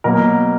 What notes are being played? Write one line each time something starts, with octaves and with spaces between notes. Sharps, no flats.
B2 F#3 A#3 A#4